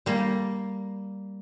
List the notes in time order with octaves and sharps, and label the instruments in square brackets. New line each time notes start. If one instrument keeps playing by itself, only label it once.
[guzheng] G3 A#3